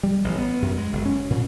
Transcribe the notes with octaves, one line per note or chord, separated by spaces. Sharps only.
G3
A1
B3
F#2
G#3
F#1
C#4
A#2